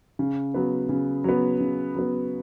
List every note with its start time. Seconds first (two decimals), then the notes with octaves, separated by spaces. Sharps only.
0.19 C#3
0.54 F#3 B3
0.89 C#3
1.24 F#3 B3
1.60 C#3
1.95 F#3 B3